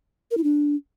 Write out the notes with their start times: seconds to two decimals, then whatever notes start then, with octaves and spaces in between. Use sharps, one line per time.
0.31 A#4
0.37 E4
0.44 D4